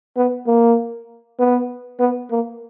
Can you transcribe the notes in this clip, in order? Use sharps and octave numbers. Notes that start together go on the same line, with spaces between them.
B3
A#3
B3
B3
A#3